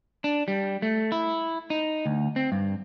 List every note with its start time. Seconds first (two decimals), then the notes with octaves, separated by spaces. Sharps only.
0.24 D4
0.48 G3
0.82 A3
1.12 E4
1.70 D#4
2.06 D2
2.36 C4
2.52 G2